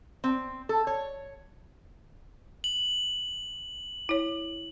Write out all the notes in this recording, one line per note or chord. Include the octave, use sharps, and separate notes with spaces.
C4
A4
C#5
F#7
E4 C#5